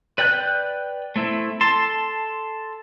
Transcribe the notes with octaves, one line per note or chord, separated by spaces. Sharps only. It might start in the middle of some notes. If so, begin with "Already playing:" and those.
B4 D5 G5 F#6 G6
A3 C4 E4
A4 A5 C6